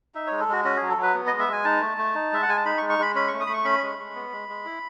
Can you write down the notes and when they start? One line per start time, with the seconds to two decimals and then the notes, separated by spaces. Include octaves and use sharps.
0.15 D#4 E5
0.27 G#3 C#5
0.40 A4
0.48 G#3 F#4
0.64 C#4 F#4
0.77 G#4
0.82 F#3
0.89 A4
0.97 F#3
1.03 B4
1.14 B3
1.27 G#3 D#5
1.39 E5
1.48 G#3 G#5
1.64 D#4 A5
1.82 A3
1.98 A3
2.15 D#4
2.32 G#3 E5
2.43 F#5
2.48 G#3 G#5
2.57 A5
2.65 D#4 B5
2.77 C#6
2.82 G#3
2.90 C#6
2.99 G#3 B5
3.15 C#4 B5
3.28 A3 C#6
3.40 D#6
3.47 A3 B5
3.53 C#6
3.65 C#4 B5
3.83 G#3
3.99 G#3
4.16 B3
4.33 G#3
4.49 G#3
4.66 E4